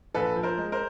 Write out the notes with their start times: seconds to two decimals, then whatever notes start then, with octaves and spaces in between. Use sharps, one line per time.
0.14 A#1 A4 B4
0.36 F3
0.43 A#4 C5
0.58 G#3
0.72 A#4 C5